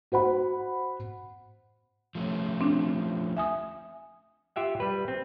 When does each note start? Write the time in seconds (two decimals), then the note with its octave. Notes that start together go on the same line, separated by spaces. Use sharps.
0.12 F#4 C5 F#5 B5
2.15 F3 A3 C#4
2.61 C4 D4
3.37 E5 G#5 D#6
4.56 F4 G4 E5 F#5
4.80 G3 B4
5.08 C4